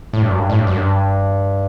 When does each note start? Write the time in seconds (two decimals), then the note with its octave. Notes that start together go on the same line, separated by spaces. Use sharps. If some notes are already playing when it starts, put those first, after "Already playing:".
0.13 A2
0.22 G2
0.31 F#2
0.39 G2
0.49 A2
0.58 G2
0.67 F#2
0.76 G2